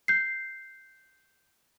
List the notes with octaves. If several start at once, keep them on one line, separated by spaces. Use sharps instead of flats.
G6 C7